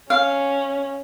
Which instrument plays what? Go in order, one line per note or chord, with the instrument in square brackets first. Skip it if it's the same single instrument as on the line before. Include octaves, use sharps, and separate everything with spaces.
[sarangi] C#4 [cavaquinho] F5